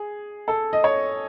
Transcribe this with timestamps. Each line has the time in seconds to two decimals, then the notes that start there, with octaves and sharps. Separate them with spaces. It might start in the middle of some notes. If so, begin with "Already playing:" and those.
Already playing: G#4
0.48 A4
0.73 D#5
0.84 C#5